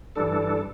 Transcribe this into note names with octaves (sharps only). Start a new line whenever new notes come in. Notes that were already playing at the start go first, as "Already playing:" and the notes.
G2 E3 G3 D4 A4